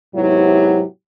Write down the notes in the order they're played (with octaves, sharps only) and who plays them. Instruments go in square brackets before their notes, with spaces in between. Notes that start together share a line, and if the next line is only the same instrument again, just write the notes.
[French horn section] G#2 C3 F#3 B3 E4 G4